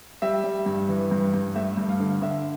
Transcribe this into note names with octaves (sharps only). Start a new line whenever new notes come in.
G3 E5
G3
G2
E3
G2
G2
A3 E5
G2
F5
D3
D3 E5